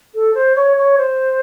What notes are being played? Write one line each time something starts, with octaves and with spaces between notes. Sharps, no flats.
A4
C5
C#5
C#5
C5